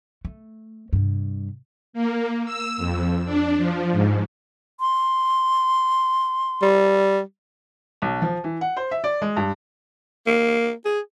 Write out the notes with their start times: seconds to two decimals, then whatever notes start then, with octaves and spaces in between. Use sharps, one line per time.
0.25 A3
0.93 G2 C3
1.93 A#3
2.45 E6
2.77 F2
3.25 D4
3.57 F3
3.92 G#2
4.80 C6
6.62 G3
8.02 B1
8.22 F3
8.44 E3
8.61 F#5
8.77 C5
8.91 E5
9.04 D5
9.22 G#3
9.37 G2
10.27 A#3
10.85 G#4